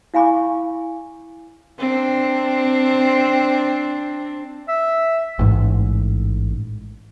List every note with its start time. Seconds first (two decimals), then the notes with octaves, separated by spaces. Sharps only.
0.14 E4 F5 G#5 B5 C#6 D6
1.79 C4 D4
4.68 E5
5.39 A1 G#2